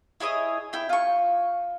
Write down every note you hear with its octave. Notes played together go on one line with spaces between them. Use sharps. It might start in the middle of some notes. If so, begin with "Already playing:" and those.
E4 G#4 C#5 D#5
E4 G5
F4 C#6